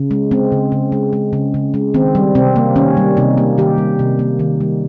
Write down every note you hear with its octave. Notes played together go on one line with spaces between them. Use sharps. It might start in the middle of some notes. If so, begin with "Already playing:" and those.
Already playing: C#3
G#3
G#3 C4
C#3
C#3
G#3
G#3
C#3
C#3
G#3
D#3 C4
G3
C3 C4
A#3
D#3 C#4
G3
C3 D#4
A#3
D#3 G4
G3
C3
A#3
D#3
G3